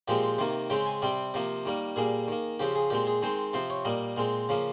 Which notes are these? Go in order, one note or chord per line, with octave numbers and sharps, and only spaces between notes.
A#2 F3 G#3 C4 G4
C3 D#3 A#3
C#3 G#3 C4 G5
G#5
C3 G3 C4 G5
C3 F3 A#3
D#3 G3 A#3
A#2 G3 A#3 G#4
D#3 A#3
C#3 F3 C4 G4
G#4
A#2 G#3 C4 G4
G#4
D#3 G#3 C4 C5
C3 F3 C4 C5
C#5
A#2 G3 A#3 D#5
A#2 G#3 C4
C#3 F3 A#3